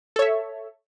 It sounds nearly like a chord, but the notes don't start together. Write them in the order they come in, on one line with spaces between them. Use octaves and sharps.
A4 C#5 E5